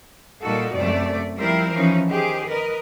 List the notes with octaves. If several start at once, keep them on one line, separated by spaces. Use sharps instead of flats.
A#2 G3 A#3 D#4 F#4 A4
F#2 C3 A3 D5
F3 G3 C4 E4 A#4 C5
E3 F3 C#4 D#4
D#3 G4 G#4 C5
A#4 B4 D#5